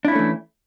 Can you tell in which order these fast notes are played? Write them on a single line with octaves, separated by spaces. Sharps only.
D4 E4 C#4 A3 E3